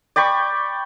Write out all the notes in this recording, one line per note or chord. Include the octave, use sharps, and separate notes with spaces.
D5 G5 B5 C#6